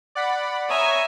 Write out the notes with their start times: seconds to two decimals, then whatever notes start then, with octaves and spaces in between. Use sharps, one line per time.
0.15 D5 F#5 B5
0.70 C#5 E5 G#5 A#5 D#6